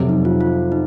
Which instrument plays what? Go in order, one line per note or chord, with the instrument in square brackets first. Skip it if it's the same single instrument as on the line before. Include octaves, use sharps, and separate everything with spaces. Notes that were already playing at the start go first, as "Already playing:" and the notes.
Already playing: [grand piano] F2 C3 F#3
[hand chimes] D#4
F4
F4
D#4